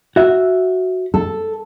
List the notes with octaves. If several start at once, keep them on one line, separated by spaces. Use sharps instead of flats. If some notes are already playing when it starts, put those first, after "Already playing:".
F#4 E5
A4